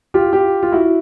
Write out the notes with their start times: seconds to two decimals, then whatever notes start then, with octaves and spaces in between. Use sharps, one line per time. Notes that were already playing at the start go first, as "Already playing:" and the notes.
0.14 F4 G4
0.33 F4 G4
0.63 F4
0.72 E4 F#4